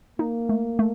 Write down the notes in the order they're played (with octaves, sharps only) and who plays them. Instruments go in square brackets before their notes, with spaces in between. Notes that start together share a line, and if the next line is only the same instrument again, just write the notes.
[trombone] A#3 [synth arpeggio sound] D#4
[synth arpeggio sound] A3
A3